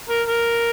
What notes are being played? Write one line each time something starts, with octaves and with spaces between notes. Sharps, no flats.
A#4
A#4